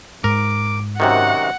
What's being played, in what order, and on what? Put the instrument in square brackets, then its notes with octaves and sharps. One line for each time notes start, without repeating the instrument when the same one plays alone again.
[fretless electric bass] G#2 [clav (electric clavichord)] A#4 [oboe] D6
[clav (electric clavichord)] F#2 C3 D#3 [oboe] F#4 [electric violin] F#5